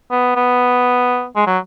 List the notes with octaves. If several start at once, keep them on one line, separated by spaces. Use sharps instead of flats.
B3
B3
G#3
F#3